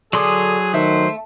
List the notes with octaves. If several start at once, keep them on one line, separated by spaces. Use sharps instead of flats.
D3 F#3 G#4 C6 D#6
D#3 A3 C5